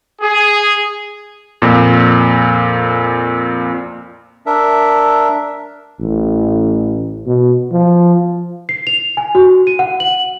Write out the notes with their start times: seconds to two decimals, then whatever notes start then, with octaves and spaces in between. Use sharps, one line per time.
0.22 G#4
1.62 F2 A#2
4.46 D4 A#4 E5
6.00 A1
7.26 B2
7.72 F3
8.69 C7
8.87 F7
9.17 G#5
9.35 F#4
9.67 D#7
9.79 F#5
10.00 F#7